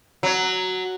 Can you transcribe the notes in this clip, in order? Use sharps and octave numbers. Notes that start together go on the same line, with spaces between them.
F#3